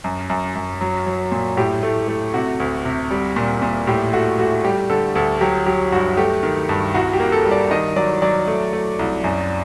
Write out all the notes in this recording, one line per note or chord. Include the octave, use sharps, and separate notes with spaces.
F#2
F#2
F#2
F#3
F#3
A#2
A2 G4
A3
A3
C3 F#4
D2
C3
G3
A#2
A#2
A2 G4
A3 F#4
A3 F#4
G3 G4
D3 A4
D2 A4
F#3 G4
F#3 G4
G2 F#4
A3 G4
D#3
G2
C2 F#4
G4
A#3
A4
G3
D5
D#3 D#5
F#3 D5
F#3 D5
A3
A3
C2
F#2